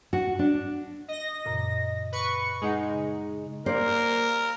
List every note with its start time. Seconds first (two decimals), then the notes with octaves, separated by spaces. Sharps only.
0.13 F#4
0.39 D4
1.08 D#5 A#6
1.45 F#2 A#2 C#3
2.12 B4 C#6
2.61 G#3 D#4 G#4 F#5
2.90 C#3
3.66 A#3 G4 A#4 C5 D5